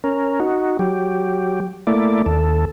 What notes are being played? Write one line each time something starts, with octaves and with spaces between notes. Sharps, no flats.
C#4 A#4
D#4 F#4
F#3 G4
A3 A#3 E4 D5
D#2 A4